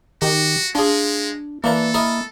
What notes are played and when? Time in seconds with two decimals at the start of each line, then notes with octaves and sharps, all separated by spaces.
0.22 D#3 F#4 G4
0.75 G#3 D4 F4 G#4
1.64 E3 A#3 D4 A4 A#5
1.94 E4 A#4 D#5